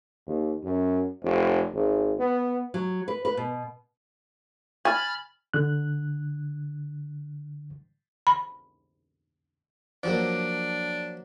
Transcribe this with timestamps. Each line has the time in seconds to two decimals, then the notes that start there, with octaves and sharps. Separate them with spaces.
0.27 D#2
0.64 F#2
1.22 F1
1.73 G#1
2.19 B3
2.74 F#3
3.08 B4
3.25 B4
3.37 B2
4.85 G#5 B5 F6 A6
5.54 D3 F#6
8.27 B5
10.03 F3 F#3 A#3 D4